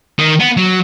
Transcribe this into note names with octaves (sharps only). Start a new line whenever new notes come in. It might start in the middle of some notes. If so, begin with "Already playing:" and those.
D#3
B3
F#3